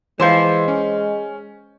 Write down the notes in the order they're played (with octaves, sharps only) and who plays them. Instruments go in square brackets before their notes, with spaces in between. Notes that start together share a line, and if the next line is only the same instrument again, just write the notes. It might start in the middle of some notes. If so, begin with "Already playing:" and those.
[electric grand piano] E3 C6 G6 [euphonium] G#3 [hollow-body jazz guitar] C5 F5
[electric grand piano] C#4